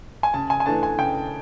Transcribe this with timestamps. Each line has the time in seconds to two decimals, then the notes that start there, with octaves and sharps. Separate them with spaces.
0.23 G#5
0.34 C#3 A5
0.50 G#5
0.60 G#5
0.66 E3 A3 D4 A5
0.83 G#5
0.98 C#3 G5